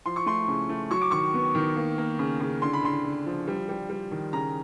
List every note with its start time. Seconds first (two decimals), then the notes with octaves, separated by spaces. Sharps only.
0.06 F3 C6
0.16 C#6
0.26 A3 C6
0.48 C#3
0.69 A3
0.91 F#3 C#6
1.01 D6
1.11 D#3 C#6
1.34 B3
1.55 D#3
1.76 A#3
1.98 A#3
2.19 C#3
2.40 C#3
2.62 D3 C6
2.73 B5
2.83 D3 C6
3.04 D3
3.26 F3
3.47 G3
3.69 G3
3.90 G3
4.11 D#3
4.33 C#3 A#5